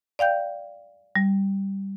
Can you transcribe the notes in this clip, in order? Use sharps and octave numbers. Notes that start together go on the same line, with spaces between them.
D5 F5 G5 G6
G3